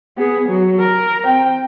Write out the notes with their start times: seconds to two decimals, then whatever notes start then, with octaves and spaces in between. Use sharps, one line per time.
0.18 B3 G#4
0.49 F#3
0.80 A#4
1.24 C4 G5